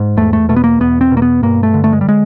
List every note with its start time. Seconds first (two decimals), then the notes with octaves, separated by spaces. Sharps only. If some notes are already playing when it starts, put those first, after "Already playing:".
Already playing: G#2
0.17 E2 A3
0.33 A3
0.49 B2 A3
0.56 B3
0.64 A#3
0.80 E2 B3
1.01 C4
1.11 B2
1.17 A#3
1.22 B3
1.43 G2 A#3
1.63 A3
1.74 D3
1.84 A3
1.93 G#3
2.01 G3
2.09 G#3